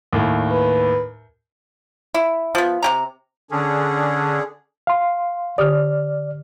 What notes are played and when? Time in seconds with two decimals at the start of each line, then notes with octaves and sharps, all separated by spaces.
0.13 D#2 A2
0.52 B4
2.14 E4
2.55 F3 B3
2.82 C3 G4 A#5
3.51 D3 C#4 D4 G#4
4.87 F5 C6
5.58 D3 G4 D5 D#6 F6